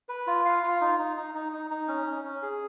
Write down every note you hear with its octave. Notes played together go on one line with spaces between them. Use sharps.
B4
F4
F5
F4
D#4
D#4
D#4
D#4
D#4
D#4
C#4
C#4
C#4
G#4